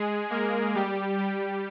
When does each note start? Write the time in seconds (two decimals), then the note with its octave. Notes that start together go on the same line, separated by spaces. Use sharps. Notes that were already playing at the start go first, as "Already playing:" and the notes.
Already playing: G#3 G#4
0.30 A#3 A#4
0.75 G3 G4
1.18 G3 G4